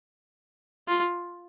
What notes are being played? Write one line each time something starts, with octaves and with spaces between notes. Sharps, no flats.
F4